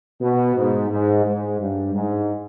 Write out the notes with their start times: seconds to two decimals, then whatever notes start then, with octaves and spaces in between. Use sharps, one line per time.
0.21 B2
0.56 G#2
0.91 G#2
1.25 G#2
1.60 G2
1.94 G#2